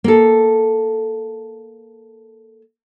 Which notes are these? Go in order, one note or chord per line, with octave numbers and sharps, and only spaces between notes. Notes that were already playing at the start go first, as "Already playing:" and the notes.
A#3 A4